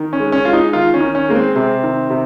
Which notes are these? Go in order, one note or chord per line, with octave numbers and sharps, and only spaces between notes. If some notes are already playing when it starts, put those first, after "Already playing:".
Already playing: D#3
C#4
G#3
C#4
G#3 F4
D#4
D#3 F4
C#4
D#3
C#4
G#3 A#3
C4
C3 C4
D#3
C3